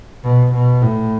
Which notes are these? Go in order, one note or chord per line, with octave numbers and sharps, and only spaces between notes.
B2
B2
A2